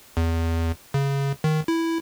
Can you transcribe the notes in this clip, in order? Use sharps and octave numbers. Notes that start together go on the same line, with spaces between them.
E2
C#3
D#3
E4